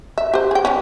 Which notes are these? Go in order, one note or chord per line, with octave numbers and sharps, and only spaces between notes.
E5
G4 C5
G#4 G5
G3 B3 C#4